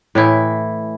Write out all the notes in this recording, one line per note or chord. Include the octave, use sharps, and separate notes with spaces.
A2 E3 E4